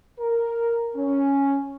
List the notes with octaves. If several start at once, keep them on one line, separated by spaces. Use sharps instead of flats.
A#4
C#4